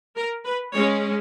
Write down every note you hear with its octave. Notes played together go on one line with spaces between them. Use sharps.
A#4
B4
G#3 C#4 C#5